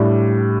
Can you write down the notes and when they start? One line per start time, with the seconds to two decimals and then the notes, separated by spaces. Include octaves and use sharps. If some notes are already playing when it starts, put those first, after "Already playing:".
Already playing: A2 G3 D4